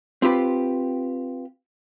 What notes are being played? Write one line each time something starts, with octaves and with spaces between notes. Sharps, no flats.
C4 F4 G4 B4